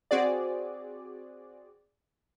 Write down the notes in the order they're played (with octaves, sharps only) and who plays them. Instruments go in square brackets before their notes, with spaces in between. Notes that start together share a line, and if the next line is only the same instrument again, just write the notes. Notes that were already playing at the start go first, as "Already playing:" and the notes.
[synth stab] C4 F#4 G#4 D5